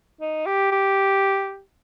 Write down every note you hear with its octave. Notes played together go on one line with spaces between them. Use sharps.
D#4
G4
G4